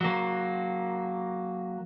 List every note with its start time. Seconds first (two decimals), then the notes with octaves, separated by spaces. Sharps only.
0.01 F#3 A#3